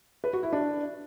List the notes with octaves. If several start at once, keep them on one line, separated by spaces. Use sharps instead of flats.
B4
F#4
E4
D4